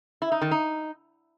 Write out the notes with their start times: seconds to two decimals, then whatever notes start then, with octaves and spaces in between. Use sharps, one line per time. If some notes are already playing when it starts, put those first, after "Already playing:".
0.22 E4
0.32 D#4
0.42 D#3
0.51 D#4